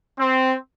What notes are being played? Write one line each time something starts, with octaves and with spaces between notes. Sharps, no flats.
C4